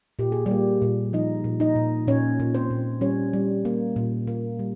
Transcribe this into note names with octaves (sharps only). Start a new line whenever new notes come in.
A#2 G4
G#4
G3 G4
A#3
A#2
F3 D#4 D#5
A#2
D#4 D#5
A#2
A#2 C#4 C#5
A#2
C4 C5
A#2
G3 C#4 C#5
G3
A#3
A#2
A#3
G3